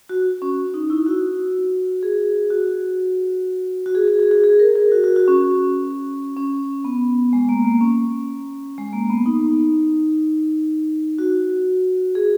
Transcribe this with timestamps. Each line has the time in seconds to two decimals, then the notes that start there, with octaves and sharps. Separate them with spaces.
0.09 F#4
0.42 C#4
0.74 D#4
0.90 E4
1.06 F#4
2.03 G#4
2.50 F#4
3.86 F#4
3.95 G#4
4.08 G#4
4.19 G#4
4.31 G#4
4.44 G#4
4.59 A#4
4.75 G#4
4.92 F#4
5.04 F#4
5.16 F#4
5.28 C#4
6.37 C#4
6.85 B3
7.33 G#3
7.49 A#3
7.65 A#3
7.81 C#4
8.78 G#3
8.93 A#3
9.10 B3
9.26 D#4
11.19 F#4
12.15 G#4